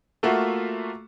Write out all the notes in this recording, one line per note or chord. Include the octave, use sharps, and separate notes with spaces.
A3 A#3 F4 F#4 E5